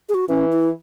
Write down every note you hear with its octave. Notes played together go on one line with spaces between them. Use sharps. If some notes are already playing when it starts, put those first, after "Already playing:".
G#4
F#4
E3 C#4
E4